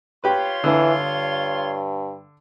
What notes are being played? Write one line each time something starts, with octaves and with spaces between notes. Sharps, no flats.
F4 G4 B4 C#5 C6
D3 E3
G2